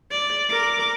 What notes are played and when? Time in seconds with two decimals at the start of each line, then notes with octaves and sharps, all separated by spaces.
0.11 D5
0.50 A#4 D6